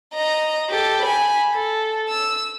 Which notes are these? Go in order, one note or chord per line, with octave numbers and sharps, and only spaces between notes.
D#5 A#5
G4 A4
G#5 B5
A4
E6